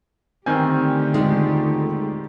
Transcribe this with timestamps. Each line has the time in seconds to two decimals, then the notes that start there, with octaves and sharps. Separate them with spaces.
0.46 D3 D#3 A3 C4 G4 G#5 F6 G6
1.14 D#1 G#3 D#4